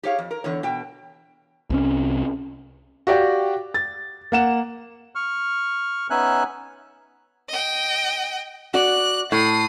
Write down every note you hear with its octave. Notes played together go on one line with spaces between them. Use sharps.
G4 G#4 C#5 F5
F2
A#4
E2 D3 C#5
B2 G5
C2 C3 C#4
F#4 G4 D5 F5 G5
A6
A#3 F#5 E7
C#6 F6
B3 C#4 D#4 E5 G#5 F#6
D#5 G5
F#4 D5 F#6
A2 D#6 C7